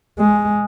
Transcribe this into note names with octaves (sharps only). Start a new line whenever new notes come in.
G#3